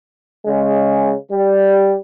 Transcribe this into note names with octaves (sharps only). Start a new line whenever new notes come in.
C#3 G#3
G3